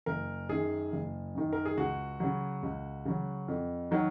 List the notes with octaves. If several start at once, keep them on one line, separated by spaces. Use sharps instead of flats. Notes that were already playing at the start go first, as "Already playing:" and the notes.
F#1 A#4
F#2 D#3 G#4
F#1
F#2 D#3
A#4
G#4
C#2 F#4
C#3 F#3
C#2
C#3 F#3
F2
D#3 F#3